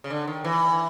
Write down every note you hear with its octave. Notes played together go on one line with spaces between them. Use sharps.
C#3
D3
D#3
E3